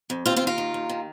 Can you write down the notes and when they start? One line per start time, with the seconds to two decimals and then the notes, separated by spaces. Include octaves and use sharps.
0.10 F2
0.26 D#2 C4 F4
0.36 C4 F4
0.41 D#2
0.47 F4 A#4
0.58 D#3
0.74 D#2
0.89 D#3